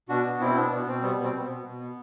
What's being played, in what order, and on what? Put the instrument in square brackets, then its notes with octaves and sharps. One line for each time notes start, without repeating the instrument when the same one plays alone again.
[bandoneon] B2 D4 F#4
B3
B2 C4 E4
B3 D4
B2 B3
B2 C4
G3 B3
B2
C4
B2
B3
B2
B2
B3